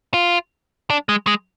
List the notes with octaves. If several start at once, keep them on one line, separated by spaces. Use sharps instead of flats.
F4
D4
G#3
G#3